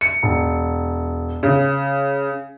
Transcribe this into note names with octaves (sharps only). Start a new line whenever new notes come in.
C#7
E1
C#3